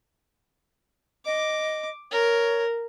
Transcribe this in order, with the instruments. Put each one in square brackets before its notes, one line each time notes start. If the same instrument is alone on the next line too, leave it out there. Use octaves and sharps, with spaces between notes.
[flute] D#5 [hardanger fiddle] D6
[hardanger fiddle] A#4 [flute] C#5